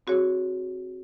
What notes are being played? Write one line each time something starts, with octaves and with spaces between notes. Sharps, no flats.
C4 F#4 G#4 C#5